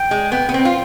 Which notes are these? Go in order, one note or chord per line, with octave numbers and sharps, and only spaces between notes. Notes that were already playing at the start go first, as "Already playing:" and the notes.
Already playing: G5
G#3
B3 G5
B3
C4
F4